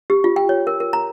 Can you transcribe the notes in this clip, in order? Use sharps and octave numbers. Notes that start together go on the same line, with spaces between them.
G4
F4
G5
C#5
A#4
A#4
A#5